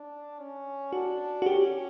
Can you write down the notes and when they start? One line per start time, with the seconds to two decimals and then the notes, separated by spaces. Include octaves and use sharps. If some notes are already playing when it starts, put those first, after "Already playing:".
Already playing: D4
0.39 C#4
0.92 D4 F#4
1.42 F#4
1.46 C#4 G4